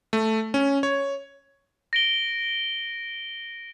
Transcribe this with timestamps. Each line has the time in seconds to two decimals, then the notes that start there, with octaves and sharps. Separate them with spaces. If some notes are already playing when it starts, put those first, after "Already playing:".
0.13 A3
0.54 C#4
0.83 C#5
1.93 A#6 D7 G7